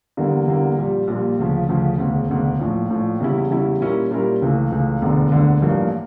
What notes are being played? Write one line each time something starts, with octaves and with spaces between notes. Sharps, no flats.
E2 D3 G3 A#3
E2 D3 G3 A#3
A#1 A#2 G3
A#1 A#2 G3
D2 C#3 F3
D2 C#3 F3
E1 D2 C#3
E1 D2 C#3
A#1 A2 F3
A#1 A2 F3
E2 C#3 G3 C#4 E4
E2 C#3 G3 C#4 E4
A#2 G3 C#4 E4 A#4
A#2 G3 C#4 E4 A#4
C#2 C#3 E3 A3
C#2 C#3 E3 A3
E1 D2 D3
E1 D2 D3
A1 G2 F3 A#3